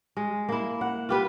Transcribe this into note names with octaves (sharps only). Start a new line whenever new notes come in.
G#3
A#3 E4
F#5
F4 G4 B4